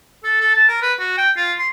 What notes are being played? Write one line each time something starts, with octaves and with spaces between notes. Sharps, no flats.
A4
A4
A5
A#4
B4
F#4
G5
F4
C6